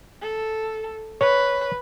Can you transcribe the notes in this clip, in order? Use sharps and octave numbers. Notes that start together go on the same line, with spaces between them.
A4
B4 C#5